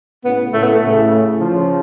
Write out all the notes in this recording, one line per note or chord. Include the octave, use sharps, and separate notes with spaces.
A2 C#3 B3
A2 C#3 A3
B3
A3
A2 C#3
C#3 F3